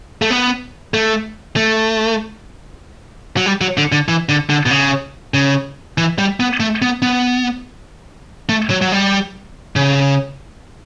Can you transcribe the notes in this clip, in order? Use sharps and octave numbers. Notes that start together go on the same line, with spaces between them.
A3
B3
A3
A3
F#3
G3
F#3
D3
D3
E3
D3
D3
B2
C#3
C#3
E3
G3
B3
A3
B3
B3
A3
F#3
F#3
G3
C#3